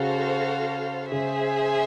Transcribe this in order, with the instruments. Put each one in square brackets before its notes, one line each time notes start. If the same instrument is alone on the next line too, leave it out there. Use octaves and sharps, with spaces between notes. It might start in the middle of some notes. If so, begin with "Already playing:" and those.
Already playing: [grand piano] C#3 [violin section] F#4 A4 C5 F5
[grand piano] C#3 [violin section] G#4 C5 E5